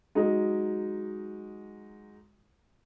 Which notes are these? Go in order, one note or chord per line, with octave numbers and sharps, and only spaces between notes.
F#3 G#3 D#4